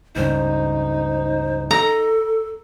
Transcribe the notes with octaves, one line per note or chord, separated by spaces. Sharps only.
C#2 G2 C#3 D#4 C5
A4 A#5